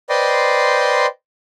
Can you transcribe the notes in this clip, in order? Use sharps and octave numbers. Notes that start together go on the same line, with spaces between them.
B4 C5 D5 D#5 G5 C6